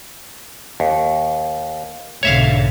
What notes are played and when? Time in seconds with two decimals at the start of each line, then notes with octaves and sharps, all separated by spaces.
0.80 D#2
2.23 B1 G#2 D3 C#5 E5 F5